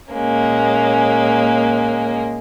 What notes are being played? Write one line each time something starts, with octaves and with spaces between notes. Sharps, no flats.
A#2 G#3 A#3 C#4